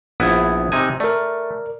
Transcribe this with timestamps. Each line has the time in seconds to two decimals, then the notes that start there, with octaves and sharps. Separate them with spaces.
0.20 A#1 B3 E4 D#6 G#6
0.72 C3 D#4 G#5
1.00 A3 A#4 D5